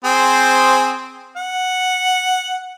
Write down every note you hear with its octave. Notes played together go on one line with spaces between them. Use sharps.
C4 G#4 C5
F#5